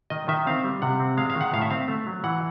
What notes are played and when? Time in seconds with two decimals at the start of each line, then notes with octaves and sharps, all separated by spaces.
0.10 D#3 D#5
0.28 D#3 E5
0.47 C4 F5
0.64 G3
0.82 C3 F#5
1.00 C4
1.17 G#3 F5
1.30 F5
1.36 D#3
1.41 F#5
1.53 A2 F5
1.62 E5
1.70 C4 F5
1.88 A3
2.07 F#3
2.24 E3 F#5